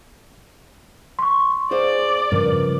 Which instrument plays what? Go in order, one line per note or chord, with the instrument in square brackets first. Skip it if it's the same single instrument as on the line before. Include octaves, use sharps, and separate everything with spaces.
[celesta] C6 C#6
[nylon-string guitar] G#4 C5 F5 [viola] D5
[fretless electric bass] G2 C#3 F3 [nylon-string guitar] A#4 B4